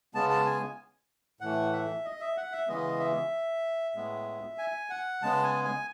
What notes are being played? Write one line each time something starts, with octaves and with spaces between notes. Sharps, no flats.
C#3 G#3 B3 A5
A5
G#5
A2 E3 A3 F#5
E5
D#5
E5
F#5
E5
C#3 E3 G#3 B3 D#5
E5
A2 G#3 B3
G#5
F#5
C#3 G#3 B3 A5
G#5
G#5